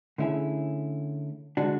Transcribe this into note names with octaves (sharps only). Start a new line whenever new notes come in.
D3 A3 C#4 E4 G#4
D3 G#3 D4 F#4